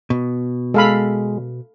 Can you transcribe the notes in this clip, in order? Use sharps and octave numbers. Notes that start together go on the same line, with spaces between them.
B2
G#3 A4 F5 B5